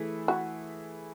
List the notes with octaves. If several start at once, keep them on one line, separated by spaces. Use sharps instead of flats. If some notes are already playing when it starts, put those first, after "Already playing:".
Already playing: E3 A3 E4 G#4
F#4